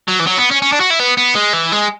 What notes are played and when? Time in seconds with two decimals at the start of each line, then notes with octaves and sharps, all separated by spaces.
0.08 F#3
0.20 E3
0.27 F#3
0.38 B3
0.51 C#4
0.62 C#4
0.72 D4
0.80 F#4
0.90 E4
1.00 B3
1.17 B3
1.35 G#3
1.53 E3
1.72 G#3